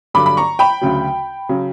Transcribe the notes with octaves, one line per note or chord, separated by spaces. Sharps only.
G2 D3 F#3 B5 D6
B5
A#5 C#6
G5 B5
D2 C#3 F#3
C#3 F#3